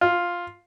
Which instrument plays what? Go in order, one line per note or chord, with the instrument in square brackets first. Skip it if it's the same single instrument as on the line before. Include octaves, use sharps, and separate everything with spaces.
[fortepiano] F4